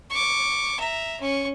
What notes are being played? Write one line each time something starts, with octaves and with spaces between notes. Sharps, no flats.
C#6 D6
E5 A#5
C#4 C#6